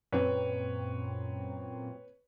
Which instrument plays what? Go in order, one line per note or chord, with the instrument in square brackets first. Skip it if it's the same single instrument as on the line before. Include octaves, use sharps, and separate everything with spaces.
[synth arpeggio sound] F#2 A#2 C4 [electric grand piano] B4 C#5